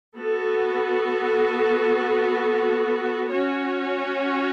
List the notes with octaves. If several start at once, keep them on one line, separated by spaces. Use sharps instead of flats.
B3 F#4 A4
C#4 F#4 C#5